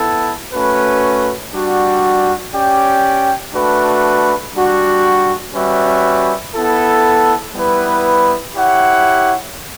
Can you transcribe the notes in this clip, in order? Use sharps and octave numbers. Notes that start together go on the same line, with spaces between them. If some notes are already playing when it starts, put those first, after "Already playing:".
Already playing: B3 E4 A4
A3 C#4 F#4 B4
G3 D4 F#4
C#4 G4 D5 G5
A3 D4 F#4 B4
G3 D4 F#4
G3 C#4 F#4 B4 E5
B3 E4 A4
G3 B3 E4 B4
E4 G4 C#5 F#5